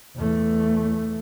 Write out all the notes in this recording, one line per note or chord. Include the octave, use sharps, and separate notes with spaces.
E2 A3